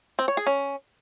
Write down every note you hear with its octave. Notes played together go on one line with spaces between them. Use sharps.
C4
C#5
G#4
C#4